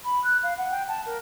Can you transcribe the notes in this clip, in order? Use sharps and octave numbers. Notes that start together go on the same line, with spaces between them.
B5
F#6
F5
F#5
G5
A5
A#4